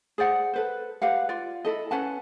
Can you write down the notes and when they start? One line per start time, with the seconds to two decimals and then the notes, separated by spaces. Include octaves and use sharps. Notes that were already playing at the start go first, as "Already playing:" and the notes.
0.18 G#4 C5 D5 F#5
0.54 A4 B4 C5
1.02 G4 B4 F5 F#5
1.29 F4 D5
1.65 E4 A4 D#5
1.91 C#4 B4 F#5 A5